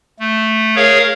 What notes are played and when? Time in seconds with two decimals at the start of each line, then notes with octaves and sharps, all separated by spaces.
0.19 A3
0.76 G#4 A#4 C#5 F5